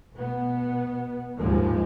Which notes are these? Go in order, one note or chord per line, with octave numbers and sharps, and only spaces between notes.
B2 B3
D#2 G#2 F3 G#3